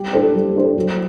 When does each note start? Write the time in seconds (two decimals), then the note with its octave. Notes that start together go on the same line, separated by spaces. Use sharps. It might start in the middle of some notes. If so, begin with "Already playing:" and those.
Already playing: G3 G4
0.13 D4 A4 C5
0.34 G3
0.56 D4 A4 C5
0.77 F#3